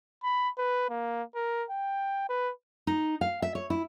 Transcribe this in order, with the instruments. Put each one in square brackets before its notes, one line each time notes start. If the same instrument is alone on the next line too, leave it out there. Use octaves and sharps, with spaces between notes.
[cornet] B5
B4
A#3
A#4
G5
B4
[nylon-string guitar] D#4
F5
E5
C#5
E4